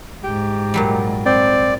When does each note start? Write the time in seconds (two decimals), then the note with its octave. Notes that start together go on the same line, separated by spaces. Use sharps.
0.24 G#2 G4
0.74 A#2 F#3 G3
1.26 C4 D5